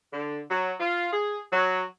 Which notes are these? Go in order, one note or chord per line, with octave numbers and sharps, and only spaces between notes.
D3
F#3
F4
G#4
F#3